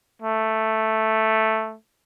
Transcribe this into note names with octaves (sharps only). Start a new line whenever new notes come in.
A3